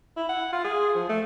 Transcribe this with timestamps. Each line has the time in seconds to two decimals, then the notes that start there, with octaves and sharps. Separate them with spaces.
0.17 E4
0.29 F#5
0.53 F4
0.64 G#4
0.95 F3
1.09 A3